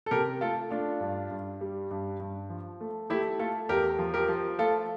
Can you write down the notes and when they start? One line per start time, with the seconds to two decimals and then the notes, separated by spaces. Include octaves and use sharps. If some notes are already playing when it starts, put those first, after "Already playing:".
0.06 A4
0.11 C3 G4 A#4
0.41 A3 F4 A4
0.71 A3 D4 F4
1.00 G2
1.31 G2
1.61 G3
1.91 G2
2.20 G2
2.50 F3
2.81 A3
3.10 A3 E4 G4
3.39 A3 F4 A4
3.69 E2 G4 A#4
3.99 F3
4.14 G4 A#4
4.29 F3
4.59 A3 F4 A4